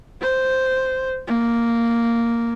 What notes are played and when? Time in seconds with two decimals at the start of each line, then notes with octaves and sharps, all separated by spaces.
0.21 C5
1.28 A#3